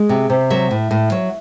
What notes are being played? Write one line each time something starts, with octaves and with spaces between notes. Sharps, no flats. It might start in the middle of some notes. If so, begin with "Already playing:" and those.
Already playing: G#3
C3
C3
F#3 E5
A2
A2
F#3